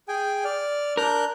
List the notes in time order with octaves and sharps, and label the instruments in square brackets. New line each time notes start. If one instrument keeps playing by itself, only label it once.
[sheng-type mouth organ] G#4 G5 G#5
D5 F6
[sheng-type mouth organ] D4 F#6 G6 [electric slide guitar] A#4